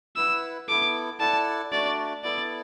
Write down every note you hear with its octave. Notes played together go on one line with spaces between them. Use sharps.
E4 B4 F#5 E6
B3 E4 A4 D6
E4 A4 D5 F#5 A5
A3 D4 F#4 D5
B3 E4 A4 D5